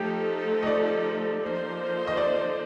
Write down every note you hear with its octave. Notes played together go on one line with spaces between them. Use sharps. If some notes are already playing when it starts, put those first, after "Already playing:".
Already playing: F3 A3 D#4 G4 A4
D#5
D5
F3 A#3 D#4 A4 C5
D#5
D5